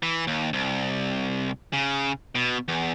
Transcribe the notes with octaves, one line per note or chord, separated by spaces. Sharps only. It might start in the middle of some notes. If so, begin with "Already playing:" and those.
E3
D#2
C2
C#3
B2
E2